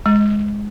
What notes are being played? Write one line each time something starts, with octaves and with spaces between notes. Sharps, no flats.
G#3